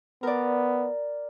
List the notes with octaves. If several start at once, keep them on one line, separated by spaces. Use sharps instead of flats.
B3 A#4 D5